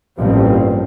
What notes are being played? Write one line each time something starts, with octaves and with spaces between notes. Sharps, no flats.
A1 G2 B2 F3 A#3 C4